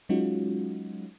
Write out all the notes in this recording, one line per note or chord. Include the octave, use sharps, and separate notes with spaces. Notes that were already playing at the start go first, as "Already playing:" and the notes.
F#3 G#3 C#4 D#4 F4 F#4